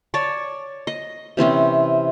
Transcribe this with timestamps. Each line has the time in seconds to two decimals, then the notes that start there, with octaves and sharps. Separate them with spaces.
0.14 C#5 D5 A5
0.87 D#5
1.37 C3 E3 C4 C#4